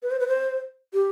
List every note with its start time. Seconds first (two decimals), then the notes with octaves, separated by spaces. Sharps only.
0.03 B4
0.11 C5
0.20 B4
0.28 C5
0.94 G4